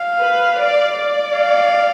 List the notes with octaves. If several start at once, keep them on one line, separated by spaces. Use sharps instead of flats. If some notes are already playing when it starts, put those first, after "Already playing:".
Already playing: F5
B4
D5
D5
F5